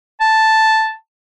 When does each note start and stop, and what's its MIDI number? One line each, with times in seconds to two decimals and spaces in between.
0.21 0.92 81